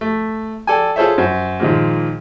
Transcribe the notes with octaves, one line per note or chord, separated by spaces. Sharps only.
A3
A4 D5 G5 G#5
F4 G#4 A4 C5 C#5 E5
F#2 C5
A#2 D#3 F3 G#3 A#3